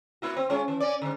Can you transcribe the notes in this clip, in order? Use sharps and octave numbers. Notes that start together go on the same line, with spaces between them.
A#3 E4 F#4
C4
G#3 C#4 F4
E3
C#4 D5
G#2 D3